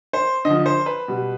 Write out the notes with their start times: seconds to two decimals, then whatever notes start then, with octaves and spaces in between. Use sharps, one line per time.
0.13 C5
0.45 D3 D#5
0.50 F3
0.66 C5
0.86 B4
1.08 B2 G3